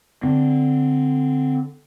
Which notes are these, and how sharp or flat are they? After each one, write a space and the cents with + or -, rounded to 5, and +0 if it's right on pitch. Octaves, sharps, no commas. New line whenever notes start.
D3 +0 C4 -15